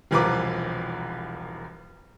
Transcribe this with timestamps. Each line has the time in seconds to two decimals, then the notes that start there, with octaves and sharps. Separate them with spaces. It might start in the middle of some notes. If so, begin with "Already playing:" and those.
0.11 E1 C2 F3 A#4 B4 D6